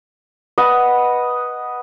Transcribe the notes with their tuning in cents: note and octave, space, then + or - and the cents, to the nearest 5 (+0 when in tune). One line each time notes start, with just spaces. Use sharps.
B4 -10 D#5 +0 F#5 +0